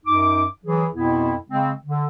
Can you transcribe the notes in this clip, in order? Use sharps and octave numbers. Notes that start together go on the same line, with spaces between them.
F#2 D#4 D6
E3 F#3 G#4
F2 B2 B3 C4 E4
C#3 G#3 C4
D3